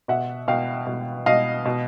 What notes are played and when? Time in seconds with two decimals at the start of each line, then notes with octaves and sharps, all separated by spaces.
0.08 B2 E5 F#5
0.48 B2 F5 G5
0.87 B2
1.26 B2 D#5 F5
1.65 B2